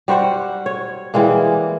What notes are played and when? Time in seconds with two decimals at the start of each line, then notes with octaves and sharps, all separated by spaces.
0.08 G3 F#4 C5 F#5
0.66 C#5
1.14 E3 G3 G#3 A#3